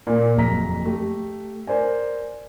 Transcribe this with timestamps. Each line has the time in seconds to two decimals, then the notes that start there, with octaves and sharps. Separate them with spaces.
0.07 A#2 A#3
0.37 F#1 F2 A#5 B6
0.85 A3 G4
1.67 A#4 C5 D5 G#5